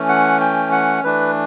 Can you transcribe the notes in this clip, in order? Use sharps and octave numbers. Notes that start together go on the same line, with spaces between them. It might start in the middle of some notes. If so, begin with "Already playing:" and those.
Already playing: E3 A3 C#4
F#5
G5
F#5
E3 A3 D4 B4